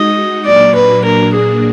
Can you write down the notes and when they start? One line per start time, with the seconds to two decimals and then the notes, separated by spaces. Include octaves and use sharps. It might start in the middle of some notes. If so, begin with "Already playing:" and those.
Already playing: G#3 D#4 F#4 D#5
0.45 A#2 F#3 A#3 D4 F#4 D5
0.75 B4
1.05 A#4
1.33 G#4